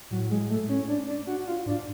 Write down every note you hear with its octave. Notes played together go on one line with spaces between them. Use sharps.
A2 F#3
G#3
A3
C#4
D4
D4
F#4
F4
G#2 D4